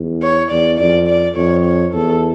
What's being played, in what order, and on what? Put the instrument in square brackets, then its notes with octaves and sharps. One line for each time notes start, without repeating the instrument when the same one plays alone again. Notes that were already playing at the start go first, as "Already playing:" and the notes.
Already playing: [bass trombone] E2
[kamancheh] C#5
[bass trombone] E2 [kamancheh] D5
[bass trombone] F2 [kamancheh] D5
[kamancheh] D5
[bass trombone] F2 [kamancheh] C#5
[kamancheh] C#5
[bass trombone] E2 [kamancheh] A4